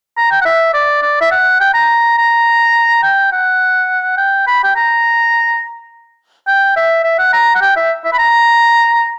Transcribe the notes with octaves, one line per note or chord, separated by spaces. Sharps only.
A#5
G5
F#5
E5
D5
D5
E5
F#5
G5
A#5
A#5
G5
F#5
G5
B5
G5
A#5
G5
E5
E5
F#5
A#5
F#5
G5
E5
E5
B5
A#5